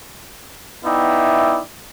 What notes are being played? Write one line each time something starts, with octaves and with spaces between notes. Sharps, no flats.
B3 D#4 E4 D5 E5 G5